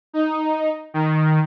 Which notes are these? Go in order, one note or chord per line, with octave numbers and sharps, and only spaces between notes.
D#4
D#3